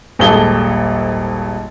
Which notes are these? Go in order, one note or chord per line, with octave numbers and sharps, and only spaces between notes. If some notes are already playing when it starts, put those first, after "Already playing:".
D#1 G#1 G#4 A4 G7